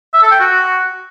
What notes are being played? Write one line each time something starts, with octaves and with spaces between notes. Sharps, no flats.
E5
A4
G5
F#4